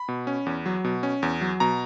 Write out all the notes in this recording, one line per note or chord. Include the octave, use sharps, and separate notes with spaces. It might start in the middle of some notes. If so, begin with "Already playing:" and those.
Already playing: B5
B2
C#4
E2
F#3
B2
C#4
E2
F#3
B2 A#5